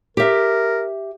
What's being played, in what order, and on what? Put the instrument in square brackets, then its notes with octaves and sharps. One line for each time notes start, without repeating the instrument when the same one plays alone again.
[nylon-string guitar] G4 E5 [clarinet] A#4